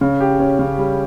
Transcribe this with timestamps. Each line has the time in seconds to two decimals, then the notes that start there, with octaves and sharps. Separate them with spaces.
0.01 C#3
0.20 G4
0.40 C#4
0.59 C#3
0.78 G3